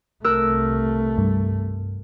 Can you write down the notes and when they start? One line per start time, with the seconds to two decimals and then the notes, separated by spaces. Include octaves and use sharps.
0.24 C2 A3 A#4 E6 F#6
1.18 G2